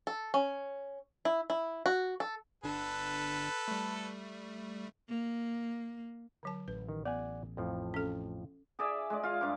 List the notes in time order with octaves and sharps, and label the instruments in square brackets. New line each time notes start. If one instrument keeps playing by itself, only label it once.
[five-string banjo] A4
C#4
E4
E4
F#4
A4
[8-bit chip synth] G1 D3 D4 [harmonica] A4 B4
[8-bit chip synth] G3 A3
[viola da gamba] A#3
[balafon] D3 F#3 A5
[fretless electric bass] A1 [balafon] B4
[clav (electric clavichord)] D#3
[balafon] B3 [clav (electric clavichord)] D5 F#5 G#5
[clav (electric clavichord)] F2 A2 F3
[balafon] C#4 A4
[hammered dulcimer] G#4 D5 E5 G#5
G#3 D5
F4 F5
G2 D6